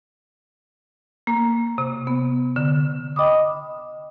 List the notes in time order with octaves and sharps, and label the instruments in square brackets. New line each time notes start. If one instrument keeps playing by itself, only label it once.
[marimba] A#3
C3
B3
D3
D#5 G5 B5 D6 D#6